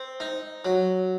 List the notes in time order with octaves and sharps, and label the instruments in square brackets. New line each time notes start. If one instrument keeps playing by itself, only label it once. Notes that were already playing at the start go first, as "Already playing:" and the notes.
Already playing: [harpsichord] C4
D#4
F#3